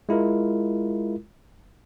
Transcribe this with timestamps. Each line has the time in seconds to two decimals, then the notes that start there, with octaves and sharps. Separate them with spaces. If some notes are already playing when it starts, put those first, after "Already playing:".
0.09 G#3 E4 F4 A#4